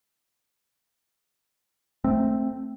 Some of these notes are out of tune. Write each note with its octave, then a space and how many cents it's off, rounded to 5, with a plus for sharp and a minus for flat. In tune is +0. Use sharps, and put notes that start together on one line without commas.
A3 +0 C4 +5